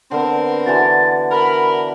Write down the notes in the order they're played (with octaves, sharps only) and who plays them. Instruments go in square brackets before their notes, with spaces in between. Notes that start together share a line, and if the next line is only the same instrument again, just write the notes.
[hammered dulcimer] D3 B3 [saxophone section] C4 A#4
[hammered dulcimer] D3 E3 F#4 [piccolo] A6
[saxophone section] A#4 [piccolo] B5